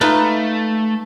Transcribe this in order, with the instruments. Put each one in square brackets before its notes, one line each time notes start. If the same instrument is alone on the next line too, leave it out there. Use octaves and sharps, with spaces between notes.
[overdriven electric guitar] A3 [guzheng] D#4 F4 B4